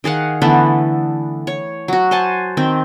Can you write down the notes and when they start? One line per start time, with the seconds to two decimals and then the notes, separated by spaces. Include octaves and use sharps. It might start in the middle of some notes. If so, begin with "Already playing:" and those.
0.04 D#3 G#4 F5 F#5
0.42 D3 E3 A3 B3
1.47 C#5
1.88 F#3 F#4
2.11 C5 F#5 G#5 A5
2.57 D#3 C4